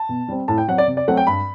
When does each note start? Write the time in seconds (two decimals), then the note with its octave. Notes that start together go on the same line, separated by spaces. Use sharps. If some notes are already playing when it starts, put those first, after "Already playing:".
Already playing: A5
0.09 B2
0.28 G3 C4
0.48 A2 A5
0.58 G5
0.68 F#3 C4 F#5
0.78 D5
0.87 C3
0.97 D5
1.08 F#3 A3 C4 F#5
1.17 G5
1.27 G2 B5